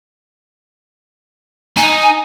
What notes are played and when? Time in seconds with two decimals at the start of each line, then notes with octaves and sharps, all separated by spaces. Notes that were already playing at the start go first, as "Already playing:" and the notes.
1.77 D#4 G#5